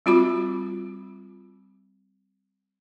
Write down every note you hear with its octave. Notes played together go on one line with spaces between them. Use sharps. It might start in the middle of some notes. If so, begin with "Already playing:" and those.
G3 C4 F4 F#4 B5 D6